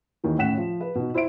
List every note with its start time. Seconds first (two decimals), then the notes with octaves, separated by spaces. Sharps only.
0.24 D#2 D#3 E3
0.38 A2 C#4 F#5 B6 E7
0.57 F3
0.81 B4
0.95 B2 D#4
1.14 E4 C5 E5 D7